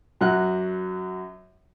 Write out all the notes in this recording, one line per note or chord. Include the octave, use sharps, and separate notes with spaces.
F#2 F#3 F#5 F#6